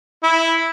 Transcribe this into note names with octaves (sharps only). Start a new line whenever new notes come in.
E4